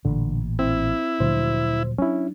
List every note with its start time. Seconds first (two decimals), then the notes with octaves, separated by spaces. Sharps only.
0.05 A1 A#2 D3
0.59 C4 E4
1.20 D2 A#2 F3 F#3 C5
1.98 F#3 C#4 D4 E4